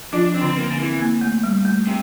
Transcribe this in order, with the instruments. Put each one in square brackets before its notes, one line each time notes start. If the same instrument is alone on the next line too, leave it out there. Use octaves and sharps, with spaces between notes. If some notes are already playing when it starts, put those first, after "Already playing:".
[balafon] F3 F4 [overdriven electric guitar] D4
[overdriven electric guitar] C4
[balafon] D3 D4
[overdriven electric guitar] A#3
[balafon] C4
[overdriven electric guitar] E3
[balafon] A#3
A3
G3
A3
[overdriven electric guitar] C3